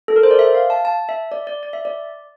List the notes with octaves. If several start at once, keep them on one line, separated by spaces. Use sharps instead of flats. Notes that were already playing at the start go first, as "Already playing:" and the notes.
A4
A#4
C5
D5
E5
F5
A5
A5
E5
D5
D5
D5
E5
D5